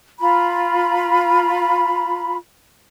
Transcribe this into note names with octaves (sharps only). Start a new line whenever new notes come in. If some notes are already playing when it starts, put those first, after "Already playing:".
F4 A#5 B5